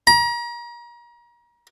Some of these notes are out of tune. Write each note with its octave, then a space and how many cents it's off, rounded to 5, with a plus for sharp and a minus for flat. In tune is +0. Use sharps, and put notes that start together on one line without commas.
A#5 +35